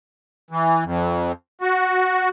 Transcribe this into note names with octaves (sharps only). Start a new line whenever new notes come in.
E3
F2
F#4